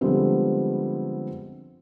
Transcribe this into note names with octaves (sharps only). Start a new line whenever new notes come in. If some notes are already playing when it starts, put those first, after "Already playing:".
D3 F3 G3 G#3 B3 C4